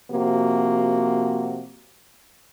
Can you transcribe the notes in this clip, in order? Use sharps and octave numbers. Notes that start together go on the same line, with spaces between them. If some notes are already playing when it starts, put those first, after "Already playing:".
C3 F3 A#3 F#4